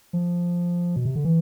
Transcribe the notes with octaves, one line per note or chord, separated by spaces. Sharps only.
F3
B2
C3
D3
E3